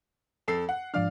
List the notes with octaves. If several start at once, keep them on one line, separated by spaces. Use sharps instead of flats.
F2 A4 C7
F#5
G#2 F3 D4 D5 F5 F6